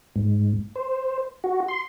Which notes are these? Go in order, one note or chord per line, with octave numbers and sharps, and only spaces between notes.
G#2
C5
F#4
C6